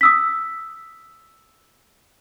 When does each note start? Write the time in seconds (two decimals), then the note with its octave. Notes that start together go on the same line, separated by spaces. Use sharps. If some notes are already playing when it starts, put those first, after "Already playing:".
0.01 D#6 E6 B6